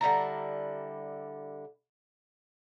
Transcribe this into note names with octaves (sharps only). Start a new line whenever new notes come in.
D3 G3 E4 A#5